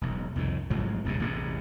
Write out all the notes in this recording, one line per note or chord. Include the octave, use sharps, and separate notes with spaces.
E1 B1
C2 F2 A2 D#3
A1 G#2 F3 F#3
D#1 C2 G2 C#3
A1 E2 C3